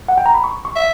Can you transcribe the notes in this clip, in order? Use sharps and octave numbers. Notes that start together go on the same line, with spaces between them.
F#5
G5
A#5
B5
C#6
C#6
E5